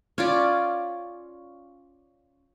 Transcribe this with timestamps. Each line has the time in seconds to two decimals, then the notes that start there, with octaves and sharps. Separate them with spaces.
0.18 C#4 F4 D5